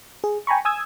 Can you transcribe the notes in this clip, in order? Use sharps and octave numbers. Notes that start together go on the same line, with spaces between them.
G#4
G5 G#5 A#5 B5 C#6
G#5 D#6 E6 G#6